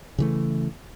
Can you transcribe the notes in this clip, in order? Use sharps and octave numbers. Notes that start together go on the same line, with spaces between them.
C#3 E3 A3